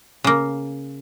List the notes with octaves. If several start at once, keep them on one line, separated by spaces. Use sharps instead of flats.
C#3 A#3